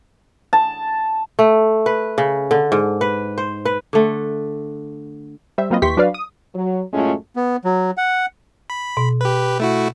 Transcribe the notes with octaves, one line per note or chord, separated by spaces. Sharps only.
A5
A3
B4
C#3
D3
G#2
B4
C5
B4
D3 A3
G3 C5 E5
F#3 A#3 C4 F4 B4 D#5
D#2 E3 G4 C6 C#6 B6
F#3 D4 F#4 B4 D5 F5
D#6
F#3
F#2 A2 G#3 A3 C#4 F4
B3
F#3
F#5
B5
B2
G4 B4
A3 E4 F#4